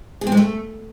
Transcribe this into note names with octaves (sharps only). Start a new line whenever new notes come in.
G#4
C4
G#3
A3